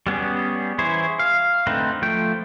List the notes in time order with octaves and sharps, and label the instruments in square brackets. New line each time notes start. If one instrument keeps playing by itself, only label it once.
[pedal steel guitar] G3 B3 C#4 G#4
E3 E4 G#4 C5 C#5
F5
D3 A3 C4 D#4 B4
F3 A3 G5